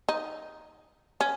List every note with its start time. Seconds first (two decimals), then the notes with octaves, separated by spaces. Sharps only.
0.09 D#4
1.21 C#4